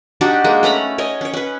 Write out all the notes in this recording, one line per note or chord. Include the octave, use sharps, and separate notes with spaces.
D4 D#4 F#4 G4
G#3 A#3
A3 C#4 A#5 B5
C#5 D#5 G#5
C#4 C#5
C#4 B4